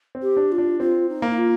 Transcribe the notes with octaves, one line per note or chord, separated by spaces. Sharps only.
C4
G4
D4
F4
D4
C4 F4
D#4
A#3
D#4
F4